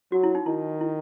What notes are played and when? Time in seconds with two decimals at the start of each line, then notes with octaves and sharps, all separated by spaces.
0.12 F#3 F#4
0.23 E4
0.35 D#4
0.46 D#3 E4
0.81 E4